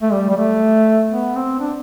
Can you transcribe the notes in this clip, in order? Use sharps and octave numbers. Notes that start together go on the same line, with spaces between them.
A3
G3
G3
A3
B3
C4
D4